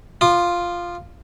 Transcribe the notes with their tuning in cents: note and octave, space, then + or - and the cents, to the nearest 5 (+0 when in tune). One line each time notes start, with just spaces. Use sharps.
F4 +0 D#6 -45